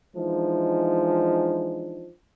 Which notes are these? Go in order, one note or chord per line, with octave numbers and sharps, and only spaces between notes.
E3 F3 G#3 D4 D#4